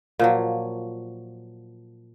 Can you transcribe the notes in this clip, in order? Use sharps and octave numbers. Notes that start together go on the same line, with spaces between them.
A#2 F3 F#3